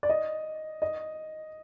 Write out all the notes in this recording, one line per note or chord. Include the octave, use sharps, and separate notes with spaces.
D5
D#5
D#5